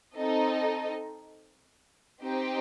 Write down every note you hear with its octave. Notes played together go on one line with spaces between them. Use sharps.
C4 D#4 A4 D#5
C4 D#4 G4 C5 G5